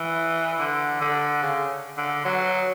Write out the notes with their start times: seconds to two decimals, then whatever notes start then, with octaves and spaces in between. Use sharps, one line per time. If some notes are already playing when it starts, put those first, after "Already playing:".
Already playing: E3
0.60 D3
1.01 D3
1.42 C#3
1.98 D3
2.25 F#3